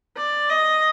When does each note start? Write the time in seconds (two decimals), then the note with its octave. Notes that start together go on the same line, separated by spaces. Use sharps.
0.17 D5
0.50 D#5